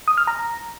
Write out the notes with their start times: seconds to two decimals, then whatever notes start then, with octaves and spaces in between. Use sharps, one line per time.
0.08 D#6
0.17 F6
0.27 A#5